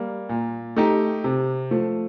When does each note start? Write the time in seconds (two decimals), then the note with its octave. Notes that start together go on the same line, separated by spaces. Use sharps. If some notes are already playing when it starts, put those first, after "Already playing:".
Already playing: G3 A#3
0.29 A#2
0.76 A3 D#4 G4
1.24 C3
1.71 F3 A3